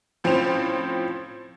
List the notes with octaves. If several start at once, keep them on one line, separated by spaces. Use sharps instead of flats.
A2 F3 C4 C#4 C5 F7